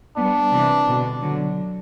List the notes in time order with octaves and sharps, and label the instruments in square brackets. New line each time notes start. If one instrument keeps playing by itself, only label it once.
[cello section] G3 B3 [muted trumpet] D4
[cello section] C3 E3
B2 D3
D3 F#3